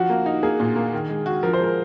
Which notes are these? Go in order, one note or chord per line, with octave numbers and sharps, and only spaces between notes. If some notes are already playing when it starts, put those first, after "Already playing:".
Already playing: F3 F#4
A#3
D#4
A#3 G#4
A#2
A#3
D#3
G#3
F#4
F3 A#4
C5
G#3 A#4